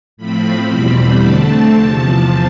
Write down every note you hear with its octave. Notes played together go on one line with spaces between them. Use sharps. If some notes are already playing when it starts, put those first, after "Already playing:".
A2 F3 C4 B5
E2 B2 G3 C4 B5
D3 A3 C4 A5
E2 C3 F3 A5